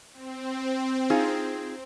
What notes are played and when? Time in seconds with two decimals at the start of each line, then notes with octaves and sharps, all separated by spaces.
0.13 C4
1.10 D#4 F4 G#4